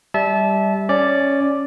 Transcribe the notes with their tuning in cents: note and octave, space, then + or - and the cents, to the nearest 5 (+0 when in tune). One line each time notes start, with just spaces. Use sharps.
G3 +0 E5 -15 A5 -25
C#4 +0 D5 +0